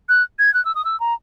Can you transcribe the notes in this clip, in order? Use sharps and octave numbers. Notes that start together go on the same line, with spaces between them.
F#6
G#6
F#6
E6
D#6
E6
A#5